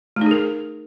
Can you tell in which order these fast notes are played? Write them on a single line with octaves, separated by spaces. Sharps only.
A3 D#4 G#4 A#4